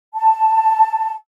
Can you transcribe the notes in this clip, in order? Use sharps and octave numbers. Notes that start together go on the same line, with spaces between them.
A5